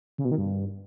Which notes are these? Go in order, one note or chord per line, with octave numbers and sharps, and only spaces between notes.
C#3
B2
D#3
G2